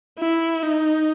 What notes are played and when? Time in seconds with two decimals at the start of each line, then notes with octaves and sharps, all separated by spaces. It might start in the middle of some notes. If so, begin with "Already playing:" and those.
0.19 E4
0.63 D#4